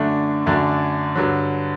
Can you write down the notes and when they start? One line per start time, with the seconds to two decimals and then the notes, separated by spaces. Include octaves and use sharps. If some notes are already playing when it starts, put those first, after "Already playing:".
Already playing: F#2 D3 A3 D4
0.46 F#2 D3 A3 D4
1.15 G2 D3 F#3